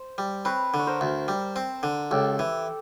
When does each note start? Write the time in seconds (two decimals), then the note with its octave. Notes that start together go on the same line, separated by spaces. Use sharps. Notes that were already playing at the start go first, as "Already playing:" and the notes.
Already playing: C5
0.18 G3
0.45 C4 B4 C#5
0.74 D3
0.79 C#5
0.87 A#4 C5
1.01 D2
1.28 G3
1.56 C4
1.83 D3
2.11 C#2 G4 A4
2.39 E3